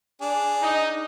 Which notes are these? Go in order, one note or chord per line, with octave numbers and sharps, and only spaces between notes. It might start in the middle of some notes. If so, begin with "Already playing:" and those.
D4 G#4
D#4